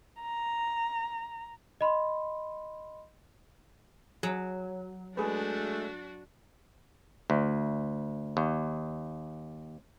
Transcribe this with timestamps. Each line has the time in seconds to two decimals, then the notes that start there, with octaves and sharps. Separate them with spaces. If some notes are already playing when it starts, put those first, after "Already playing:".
0.21 A#5
1.81 D#5 B5 C6
4.23 F#3 G#4
5.17 G#3 A3 D4 F#4 G#4 B4
7.30 D2
8.37 D#2